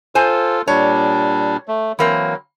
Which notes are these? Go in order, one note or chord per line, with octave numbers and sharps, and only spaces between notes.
F4 A4 C5 G#5
A#2 G3 D4 C#5
A3
E3 F#3 A#3 C4